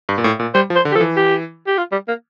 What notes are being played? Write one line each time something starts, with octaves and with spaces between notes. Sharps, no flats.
G2
A#2
A2
A#2
G3 C5
F3
C5
D3
G4
F3 A4
E3
G4
G4
F4
G3
A#3